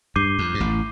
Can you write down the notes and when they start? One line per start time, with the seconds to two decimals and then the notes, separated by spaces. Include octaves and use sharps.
0.16 G2 D6 G6 C7 D#7 G7
0.39 F2
0.54 G2
0.60 A1 A2